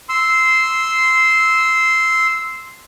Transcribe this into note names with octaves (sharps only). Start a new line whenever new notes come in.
C6 E6